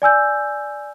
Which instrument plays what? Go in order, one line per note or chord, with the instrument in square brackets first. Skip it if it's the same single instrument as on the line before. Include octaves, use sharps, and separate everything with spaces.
[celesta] D5 G#5 E6 G6